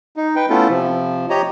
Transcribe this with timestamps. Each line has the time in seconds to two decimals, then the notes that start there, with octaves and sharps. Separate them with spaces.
0.16 D#4
0.36 B4 G5
0.50 A3 B3 C#4 E4 F4 A4
0.69 C3 F3
1.30 G4 C#5 D#5 A#5